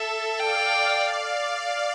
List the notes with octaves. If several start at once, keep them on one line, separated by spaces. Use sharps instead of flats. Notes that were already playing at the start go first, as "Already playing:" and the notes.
Already playing: A4 E5
D5 F5 G5
D5 F5